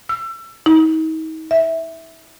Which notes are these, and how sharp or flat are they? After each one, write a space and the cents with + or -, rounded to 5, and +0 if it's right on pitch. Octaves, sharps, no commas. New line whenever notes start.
E6 +30
D#4 +40
E5 -10